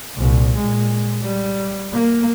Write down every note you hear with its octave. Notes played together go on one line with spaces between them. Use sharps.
C2 A#2
A#2 G#3
G3
A#3